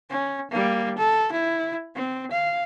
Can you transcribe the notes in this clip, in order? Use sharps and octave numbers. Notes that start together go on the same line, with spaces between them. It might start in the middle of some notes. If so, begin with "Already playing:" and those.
C#4
G3 A#3
A4
E4
C4
F5